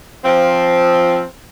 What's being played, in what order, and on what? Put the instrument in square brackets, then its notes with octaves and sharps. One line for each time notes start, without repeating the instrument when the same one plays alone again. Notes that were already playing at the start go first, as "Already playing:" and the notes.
[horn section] F3 C4